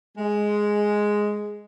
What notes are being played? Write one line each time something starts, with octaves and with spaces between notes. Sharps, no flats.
G#3